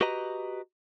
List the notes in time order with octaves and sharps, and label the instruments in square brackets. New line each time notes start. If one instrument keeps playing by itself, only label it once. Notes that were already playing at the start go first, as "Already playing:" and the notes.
[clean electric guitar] F#4 G4 B4 D#5 A#5